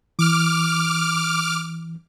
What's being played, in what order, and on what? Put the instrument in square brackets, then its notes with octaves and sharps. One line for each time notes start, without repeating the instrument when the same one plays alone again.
[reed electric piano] E3 [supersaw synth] D6 F6